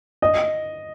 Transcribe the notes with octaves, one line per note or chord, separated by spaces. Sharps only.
D#5